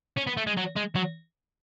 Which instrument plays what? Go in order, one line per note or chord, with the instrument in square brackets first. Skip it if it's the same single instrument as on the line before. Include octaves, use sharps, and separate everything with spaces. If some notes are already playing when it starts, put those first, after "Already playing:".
[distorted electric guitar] C#4
B3
A3
G#3
F#3
G#3
F#3